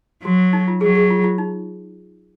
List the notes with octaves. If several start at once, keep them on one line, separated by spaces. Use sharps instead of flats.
F#3 F#4
D#4
F4
F#3 G#4
G#4
F4
F4
D#4